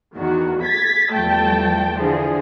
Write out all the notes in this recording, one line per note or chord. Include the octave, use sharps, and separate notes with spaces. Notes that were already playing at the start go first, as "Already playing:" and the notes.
E2 D#3 F#4
G#6 A6 B6
E2 F3 G3 A3 G5 A5
D3 E3 F3 G#4